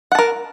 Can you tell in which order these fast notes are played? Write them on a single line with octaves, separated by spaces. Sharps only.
F#5 A5 A#4